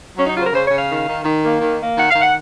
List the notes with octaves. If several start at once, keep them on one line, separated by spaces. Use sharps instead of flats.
F#3 C#4
D#4
C#3 F4 C5
A#4
C#3 C5
C#5
C#3
F5
D#3
D#3
D#3
A#3
D#3
A#3
D#3 F#5
F5
D#3 F#5